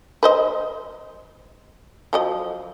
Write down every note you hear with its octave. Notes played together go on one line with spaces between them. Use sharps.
B4 C5 D#5
F3 F#3 D#5